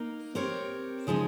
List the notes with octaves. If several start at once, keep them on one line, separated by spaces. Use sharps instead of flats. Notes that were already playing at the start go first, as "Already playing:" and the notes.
Already playing: A#3 D#4 A#4
C4 G4 A#4 C#5
C#3 F3 G#3 D#4